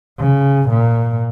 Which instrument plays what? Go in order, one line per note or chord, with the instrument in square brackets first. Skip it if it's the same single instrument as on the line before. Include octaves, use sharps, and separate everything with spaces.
[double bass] C#3
A#2